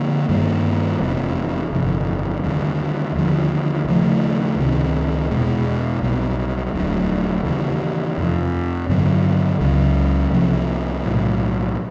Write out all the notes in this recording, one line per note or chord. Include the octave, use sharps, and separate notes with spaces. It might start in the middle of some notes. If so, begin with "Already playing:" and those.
Already playing: D3 F3 A#3
G2 D#3 G3 A#3
F1 E2 C3
G1 F2 C3
D#2 D3 G3
D#2 D3 F3
D#2 C#3 F3 A3
C#2 C3 D#3
E2 B2 G#3
B1 B2 G3
E1 D2 D3 F#3
D#2 C#3 E3
F2 C3 F3
G2 D3 F#3 B3
C#2 C#3 F#3
C2 C3 F3 A#3
B1 A2 F#3